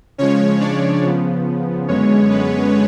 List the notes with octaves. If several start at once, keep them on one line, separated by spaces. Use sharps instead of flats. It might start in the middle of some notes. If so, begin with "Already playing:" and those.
C#3 F3 G#3 C#4 C#5
D4 D5
C#3 F3 B3
F#2 D3 G#3 B3 C#4 C#5
B3 B4